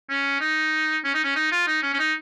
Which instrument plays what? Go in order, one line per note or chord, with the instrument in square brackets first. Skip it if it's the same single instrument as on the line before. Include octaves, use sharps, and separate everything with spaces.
[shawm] C#4
D#4
C#4
D#4
C#4
D#4
F4
D#4
C#4
C#4
D#4